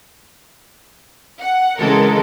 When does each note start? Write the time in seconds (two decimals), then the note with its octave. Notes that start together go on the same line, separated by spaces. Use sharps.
1.40 F#5
1.78 C#3 E3 G#3 A4 A#4